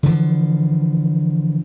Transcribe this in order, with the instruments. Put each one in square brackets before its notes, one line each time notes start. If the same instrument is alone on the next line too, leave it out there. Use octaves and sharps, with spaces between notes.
[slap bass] D3 E3 F3